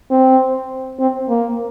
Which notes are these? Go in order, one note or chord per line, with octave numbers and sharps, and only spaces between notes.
C4
C4
A#3